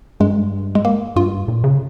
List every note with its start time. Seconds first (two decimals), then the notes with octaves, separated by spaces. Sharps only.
0.20 G2 G#3
0.75 G#3
0.85 A#3
1.16 G2 F4
1.48 A#2
1.64 C#3